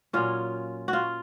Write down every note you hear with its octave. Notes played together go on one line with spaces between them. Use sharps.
A#2 F#3 C#4 F4
F#4
F4